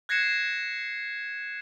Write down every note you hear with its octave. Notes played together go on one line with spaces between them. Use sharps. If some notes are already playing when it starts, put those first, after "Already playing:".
F#6 G#6 A#6 C7 C#7 E7